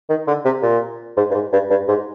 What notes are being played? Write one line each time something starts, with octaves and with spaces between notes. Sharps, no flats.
D#3
D3
C3
A#2
G#2
G2
G#2
G2
G2
G#2